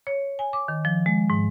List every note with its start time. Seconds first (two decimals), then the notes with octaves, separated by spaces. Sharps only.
0.07 C#5
0.39 G#5
0.53 D6
0.68 D#3
0.85 F3
1.06 G#3
1.30 G#2